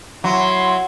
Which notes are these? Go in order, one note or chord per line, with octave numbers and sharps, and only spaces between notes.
F#3 E4 C6